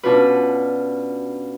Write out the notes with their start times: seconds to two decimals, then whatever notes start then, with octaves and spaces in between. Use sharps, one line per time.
0.03 B2 C#4 D4 F4 F#4 B4